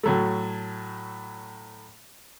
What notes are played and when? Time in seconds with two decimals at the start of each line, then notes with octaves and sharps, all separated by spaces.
0.03 A2 F#3 A3